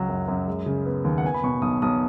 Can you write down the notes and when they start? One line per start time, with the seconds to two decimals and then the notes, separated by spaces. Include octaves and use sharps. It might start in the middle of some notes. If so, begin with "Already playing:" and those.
Already playing: C#2 F#3 C#4
0.09 F#2
0.28 F#2
0.48 G#3
0.66 C#3
0.85 B3
1.04 D#2
1.18 F#5
1.24 B3 G#5
1.34 B5
1.43 B2 C#6
1.62 B1 D#6
1.82 B1 D#6